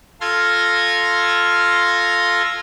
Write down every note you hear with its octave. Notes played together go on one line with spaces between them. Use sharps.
F4 A4 C6 F6 G#6 A#6